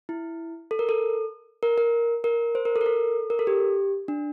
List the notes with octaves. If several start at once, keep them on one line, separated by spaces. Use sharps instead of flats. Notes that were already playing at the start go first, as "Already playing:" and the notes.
E4
A4
A#4
A4
A#4
A#4
A#4
C5
A#4
A4
A#4
A4
A#4
A4
G4
D4